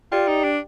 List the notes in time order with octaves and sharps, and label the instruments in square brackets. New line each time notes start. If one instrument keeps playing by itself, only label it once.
[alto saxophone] F4 [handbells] G4 D5 G5
[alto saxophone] D#4
D4